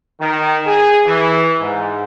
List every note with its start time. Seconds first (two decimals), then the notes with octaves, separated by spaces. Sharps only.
0.20 D#3
0.67 G#4
1.06 E3
1.60 G#2